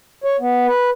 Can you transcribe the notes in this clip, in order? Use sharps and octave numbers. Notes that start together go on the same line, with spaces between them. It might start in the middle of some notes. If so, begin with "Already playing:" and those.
C#5
B3
B4